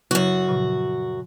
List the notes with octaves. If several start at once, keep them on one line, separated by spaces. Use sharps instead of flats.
F#2 C#3 F#3 E4 F#4
A#2 C#3 F3